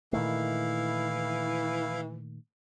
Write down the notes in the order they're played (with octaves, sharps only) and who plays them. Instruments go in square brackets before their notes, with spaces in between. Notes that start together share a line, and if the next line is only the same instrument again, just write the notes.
[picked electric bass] A#2 D#3 A3 [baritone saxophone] E3 [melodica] E4 F5